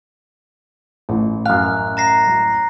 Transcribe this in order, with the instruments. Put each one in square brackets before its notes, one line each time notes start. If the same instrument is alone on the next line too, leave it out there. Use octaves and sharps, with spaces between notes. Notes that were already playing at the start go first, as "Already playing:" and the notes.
[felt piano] A1
[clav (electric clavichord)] F#2 F5 [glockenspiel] F#6
[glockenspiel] A#5 A#6 C7